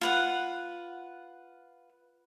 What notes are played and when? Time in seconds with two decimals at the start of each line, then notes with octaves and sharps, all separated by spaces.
0.01 F4 B4 F#5